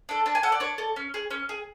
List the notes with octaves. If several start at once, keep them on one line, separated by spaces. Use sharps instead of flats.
D4 A4
D4 A5
G#5
A4 F#5
D5
D4 C#5
A4
C#4
G#4
C#4
G#4